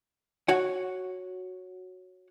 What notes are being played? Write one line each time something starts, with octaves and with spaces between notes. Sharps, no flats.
F#4 C#5 F#5